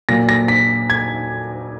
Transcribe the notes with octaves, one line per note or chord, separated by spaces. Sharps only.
A#2 F#3 A#3 A#6
A#6
B6
G#6